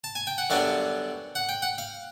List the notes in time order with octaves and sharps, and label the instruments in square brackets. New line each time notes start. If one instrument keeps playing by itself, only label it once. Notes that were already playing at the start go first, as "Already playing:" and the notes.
[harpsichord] A5
G#5
G5
F#5
F#2 D3 G3 B3 D4 F5
F#5
G5
F#5
F5